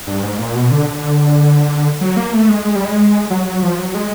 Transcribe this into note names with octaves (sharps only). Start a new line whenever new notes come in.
G2
G#2
A#2
B2
D3
F#3
A#3
A3
G#3
G#3
G3
G#3
F#3
F#3
F3
F#3
G#3